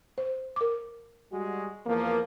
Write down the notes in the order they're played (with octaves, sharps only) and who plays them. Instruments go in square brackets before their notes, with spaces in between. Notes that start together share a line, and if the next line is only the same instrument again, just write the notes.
[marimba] C5
A#4 D6
[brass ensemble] G3 G#3 F#4
E2 F3 A#3